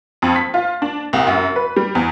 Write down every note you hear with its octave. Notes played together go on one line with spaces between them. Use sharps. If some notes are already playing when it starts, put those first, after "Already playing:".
F2
B6
F4
D4
C2
F#2
B4
G3
E2